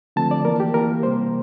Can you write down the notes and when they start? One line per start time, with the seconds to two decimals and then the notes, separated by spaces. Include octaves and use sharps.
0.16 D3 F3 A3 C4 A5
0.31 D5
0.45 E3 A#3 A#4
0.60 G4
0.74 E3 A#3 A#4
1.03 C3 G3 A#3 C5